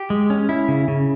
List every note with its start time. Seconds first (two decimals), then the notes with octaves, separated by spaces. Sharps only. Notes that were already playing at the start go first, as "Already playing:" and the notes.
Already playing: G4
0.10 G#3
0.30 C#4
0.49 E4
0.68 C#3
0.88 C#3